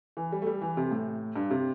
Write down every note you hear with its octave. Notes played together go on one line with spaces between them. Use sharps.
E3
G3
A3
G3
E3
C3
A2
G2
C3